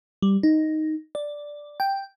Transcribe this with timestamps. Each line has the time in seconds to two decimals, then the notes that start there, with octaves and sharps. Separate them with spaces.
0.22 G3
0.43 D#4
1.15 D5
1.80 G5